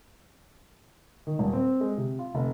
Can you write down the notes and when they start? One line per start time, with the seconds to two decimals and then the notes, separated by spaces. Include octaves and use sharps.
1.27 D#3
1.39 D#1
1.53 C4
1.81 G#3
1.97 C3
2.19 F4
2.35 F1